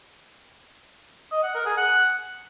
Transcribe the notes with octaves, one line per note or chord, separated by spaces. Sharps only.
D#5
F#5
A#4
G#4
F#5